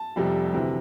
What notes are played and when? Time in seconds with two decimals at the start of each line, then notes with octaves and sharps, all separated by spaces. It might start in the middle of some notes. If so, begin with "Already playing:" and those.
Already playing: A5
0.16 F1 F2 C3 G3
0.53 D2 C3 E3